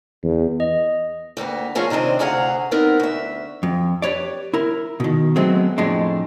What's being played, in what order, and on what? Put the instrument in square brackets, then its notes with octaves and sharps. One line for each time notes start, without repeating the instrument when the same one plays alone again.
[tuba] E2
[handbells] D#5
[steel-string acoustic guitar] D2 G2 A#3 B3
F3 A3 C#4 F4 G#4 A#4
C3 D#3 C4 D4 D#5
D2 C3 G#4 F5 F#5 A#5
B3 C4 D#4 A#4
D2 E5
[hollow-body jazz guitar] F2
G4 B4 C#5 D5
E4 A#4
B2 D#3
F#3 G#3 A3 B3 C4
F2 A2 G#3 D4